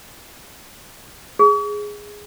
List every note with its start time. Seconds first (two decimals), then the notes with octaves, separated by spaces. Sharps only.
1.39 G#4